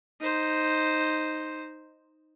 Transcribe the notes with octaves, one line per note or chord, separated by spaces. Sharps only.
D#4 C5